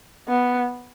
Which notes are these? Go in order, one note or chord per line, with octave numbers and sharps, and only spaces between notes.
B3